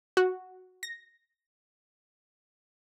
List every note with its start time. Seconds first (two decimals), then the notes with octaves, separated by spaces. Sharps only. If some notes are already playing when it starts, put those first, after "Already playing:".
0.17 F#4
0.83 A#6